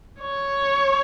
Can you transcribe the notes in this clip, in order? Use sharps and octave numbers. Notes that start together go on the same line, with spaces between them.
C#5